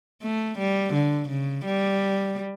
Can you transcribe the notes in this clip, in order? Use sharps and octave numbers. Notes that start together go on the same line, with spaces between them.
A3
G3
D3
C#3
G3